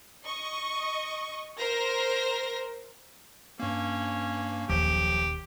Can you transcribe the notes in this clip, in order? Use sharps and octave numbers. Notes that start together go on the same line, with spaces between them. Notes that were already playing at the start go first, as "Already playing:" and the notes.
D#5 C#6
A#4 C5 A#6
G2 A#3 C#4
D#1 B1 F3 G4